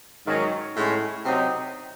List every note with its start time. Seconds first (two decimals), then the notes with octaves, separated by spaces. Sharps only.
0.26 G#2 D#3 F#3 C#4
0.76 A2 G#3 C#4
1.25 C3 F#3 C4 D#4